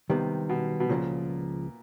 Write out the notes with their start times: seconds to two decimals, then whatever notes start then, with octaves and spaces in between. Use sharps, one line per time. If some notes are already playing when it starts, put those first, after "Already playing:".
0.10 C3 D#3 G3 B3
0.49 B2
0.80 B2
0.89 C#2 A#2 C#3 F3